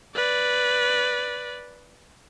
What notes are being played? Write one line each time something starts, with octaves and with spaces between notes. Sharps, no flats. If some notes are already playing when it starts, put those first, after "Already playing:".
B4 D5